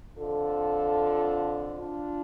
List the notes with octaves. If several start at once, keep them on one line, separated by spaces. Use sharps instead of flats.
F2 D3 F3 F4 A4
D4 F4